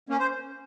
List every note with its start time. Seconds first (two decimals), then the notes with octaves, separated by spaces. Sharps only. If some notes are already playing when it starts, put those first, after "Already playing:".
0.09 A#3 C#4
0.20 C5